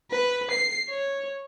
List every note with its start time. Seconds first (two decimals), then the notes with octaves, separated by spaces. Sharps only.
0.11 B4
0.51 C7
0.89 C#5